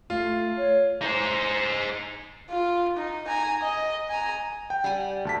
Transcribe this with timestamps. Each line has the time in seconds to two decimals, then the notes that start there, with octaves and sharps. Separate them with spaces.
0.10 A3 F4
0.58 C#5
1.02 D#4 C5
2.50 F4
2.97 D#4
3.28 G#5 A#5
3.62 D#5
4.09 G#5 A#5
4.70 G5
4.84 G3 F#5 G#5
5.25 D2 A5 B6